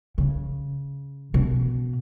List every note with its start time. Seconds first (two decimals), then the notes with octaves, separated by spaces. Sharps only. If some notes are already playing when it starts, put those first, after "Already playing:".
0.18 C#3
1.34 B2